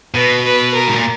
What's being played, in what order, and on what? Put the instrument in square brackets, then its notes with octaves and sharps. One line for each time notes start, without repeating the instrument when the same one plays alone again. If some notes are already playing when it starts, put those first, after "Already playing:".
[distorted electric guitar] B2 [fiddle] B4
[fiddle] B4
A#4
[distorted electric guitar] G#2
A#2